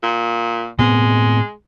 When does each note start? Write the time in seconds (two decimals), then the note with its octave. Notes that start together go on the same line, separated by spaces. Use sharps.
0.03 A#2
0.79 A2 G#3 B3 C4